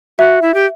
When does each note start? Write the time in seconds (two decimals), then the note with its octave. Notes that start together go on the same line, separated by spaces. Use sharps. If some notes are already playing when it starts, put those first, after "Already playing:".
0.18 F#4 E5
0.42 E4
0.54 G4